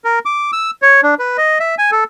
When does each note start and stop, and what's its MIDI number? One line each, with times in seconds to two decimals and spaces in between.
0.04 0.19 70
0.25 0.51 86
0.53 0.71 88
0.82 1.01 73
1.03 1.15 62
1.19 1.37 71
1.38 1.59 75
1.60 1.75 76
1.78 1.91 80
1.92 2.04 69